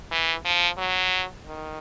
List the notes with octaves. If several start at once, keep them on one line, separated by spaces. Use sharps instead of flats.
E3
F3
F#3
D#3